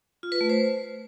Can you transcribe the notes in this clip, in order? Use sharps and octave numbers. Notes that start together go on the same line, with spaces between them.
F4
B4
A3
C5